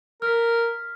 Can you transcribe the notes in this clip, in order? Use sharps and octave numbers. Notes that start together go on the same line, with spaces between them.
A#4 F6 B6